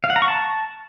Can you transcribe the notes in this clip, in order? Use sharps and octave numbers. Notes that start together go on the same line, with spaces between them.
F5
F#5
A#5
C#6
A5